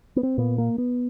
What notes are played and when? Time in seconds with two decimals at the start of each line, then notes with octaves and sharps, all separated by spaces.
0.16 B3
0.23 C4
0.38 A#2 B3
0.58 A#3
0.78 B3